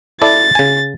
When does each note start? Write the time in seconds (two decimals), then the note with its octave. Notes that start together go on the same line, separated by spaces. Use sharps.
0.22 E4 A4 D5 A6
0.55 C#3 G#5